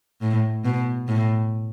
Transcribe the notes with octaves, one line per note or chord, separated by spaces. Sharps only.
A2
B2
A2